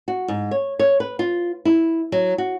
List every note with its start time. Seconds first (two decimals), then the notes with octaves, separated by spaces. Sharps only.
0.08 F#4
0.28 G#2
0.51 C#5
0.79 C#5
1.00 B4
1.19 F4
1.65 E4
2.12 F#3
2.38 F#4